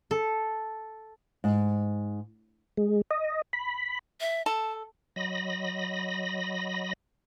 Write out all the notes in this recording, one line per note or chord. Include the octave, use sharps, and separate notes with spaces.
A4
G#2
G#3
D#5
B5
E5
A4 A5
F#3 D#5 B5 A#6